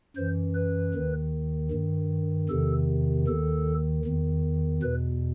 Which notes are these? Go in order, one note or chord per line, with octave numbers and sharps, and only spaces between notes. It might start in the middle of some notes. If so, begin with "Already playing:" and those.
F#2 E3 C5
B4
D#2 D#3
G2 D#3
E2 C3 D#3 A4
D#2 D#3 A4
E2 D#3
E2 B2 B4